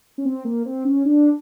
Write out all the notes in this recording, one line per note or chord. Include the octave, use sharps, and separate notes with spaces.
C#4
C4
A#3
C4
C#4
D4